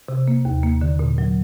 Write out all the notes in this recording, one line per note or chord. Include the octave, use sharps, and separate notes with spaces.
C3
A#3
D#2
A#3
D3
A#2
F#3